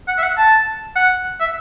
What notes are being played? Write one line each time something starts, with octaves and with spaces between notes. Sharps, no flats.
F#5
E5
F#5
A5
F#5
E5